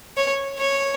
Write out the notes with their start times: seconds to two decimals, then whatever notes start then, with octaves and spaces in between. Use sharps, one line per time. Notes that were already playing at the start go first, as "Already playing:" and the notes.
0.17 C#5
0.59 C#5